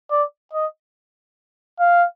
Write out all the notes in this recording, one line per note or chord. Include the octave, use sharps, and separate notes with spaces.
D5
D#5
F5